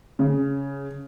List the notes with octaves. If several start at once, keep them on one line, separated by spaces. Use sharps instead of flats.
C#3